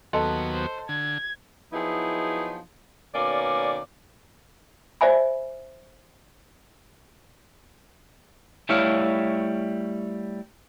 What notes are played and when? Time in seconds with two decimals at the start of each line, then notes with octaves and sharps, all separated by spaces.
0.13 D#2 F#3 B3 A4 D#5 A5 C6
0.53 C5
0.89 D3 G#6
1.73 F3 F#3 B3 D#4 E4 G#4
3.15 B2 D#3 A#3 C#4 D5
5.01 C5 D5 E5 G#5 B5
8.69 G3 A3 E4 C#5 F5